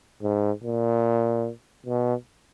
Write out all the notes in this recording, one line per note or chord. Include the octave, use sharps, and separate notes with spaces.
G#2
A#2
B2